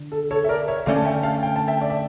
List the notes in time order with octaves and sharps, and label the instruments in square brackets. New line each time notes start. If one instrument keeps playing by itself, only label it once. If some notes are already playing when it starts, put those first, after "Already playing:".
Already playing: [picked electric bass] D3
[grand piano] A4
A4 C#5
E5
A#4 D5
C#5 E5
[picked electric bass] D3 A3 C#4 [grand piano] D5 F5
[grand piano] A5
E5 G5
F5 A5
G5
A5
E5 G5
D5
E5